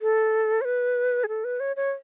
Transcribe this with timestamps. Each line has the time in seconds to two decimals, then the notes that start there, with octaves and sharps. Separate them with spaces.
0.02 A4
0.61 C#5
0.65 B4
1.24 G#4
1.28 A4
1.44 B4
1.60 C#5
1.76 C#5